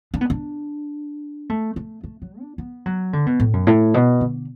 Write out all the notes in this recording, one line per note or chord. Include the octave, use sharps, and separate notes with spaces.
D4
B3
D4
A3
A3
A3
F#3
D4
B3
F#3
D3
B2
A2
F#2
A2
B2
D3